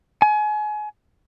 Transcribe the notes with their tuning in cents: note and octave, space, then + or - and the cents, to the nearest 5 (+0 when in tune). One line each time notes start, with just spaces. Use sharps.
G#5 +30